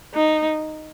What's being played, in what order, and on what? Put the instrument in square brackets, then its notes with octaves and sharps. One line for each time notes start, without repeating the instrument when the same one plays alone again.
[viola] D#4